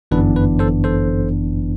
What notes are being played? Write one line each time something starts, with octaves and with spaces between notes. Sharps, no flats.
G1 F#2 E3 B3 D4 B4
B4
A4 C5
A4 C5